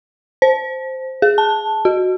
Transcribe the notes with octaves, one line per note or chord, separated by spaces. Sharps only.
C5
G#4
A5
F#4